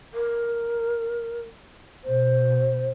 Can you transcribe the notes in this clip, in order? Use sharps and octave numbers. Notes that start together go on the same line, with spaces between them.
A#4
B2 C5